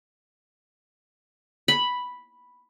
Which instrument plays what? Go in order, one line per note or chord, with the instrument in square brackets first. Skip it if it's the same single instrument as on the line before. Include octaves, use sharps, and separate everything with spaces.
[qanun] B5